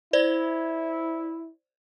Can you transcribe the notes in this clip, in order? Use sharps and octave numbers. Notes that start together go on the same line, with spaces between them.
E4 C5 D5 G#6